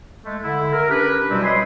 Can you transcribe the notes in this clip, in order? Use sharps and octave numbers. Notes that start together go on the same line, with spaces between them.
G#3 A3
D3 E4
A#4
C#4 D4 G4 A#4 B4
B2 F#3 G3 C4 E4
B4 C#5 D#5 G#5 B5 C6